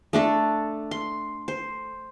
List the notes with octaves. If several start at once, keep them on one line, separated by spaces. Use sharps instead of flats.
A3 D4 A4
C6
C5